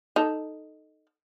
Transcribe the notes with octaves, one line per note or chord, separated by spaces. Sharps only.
D#4 A4